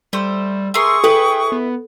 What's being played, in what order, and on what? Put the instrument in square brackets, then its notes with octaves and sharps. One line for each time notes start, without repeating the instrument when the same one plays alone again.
[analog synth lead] G3 [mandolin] A3 C5
[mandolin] A3 A#4 C6 [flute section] G#4 C#6 D#6
[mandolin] E4 B4 [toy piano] A4 [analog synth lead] G5
[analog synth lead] B3